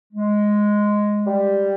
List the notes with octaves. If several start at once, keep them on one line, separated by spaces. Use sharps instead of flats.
G#3
G3